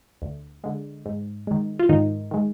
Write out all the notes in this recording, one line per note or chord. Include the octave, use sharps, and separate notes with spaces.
D2
D3 G#3
G#2
D#3 G#3
F4
G#2 D#3 D#4
D#3 G#3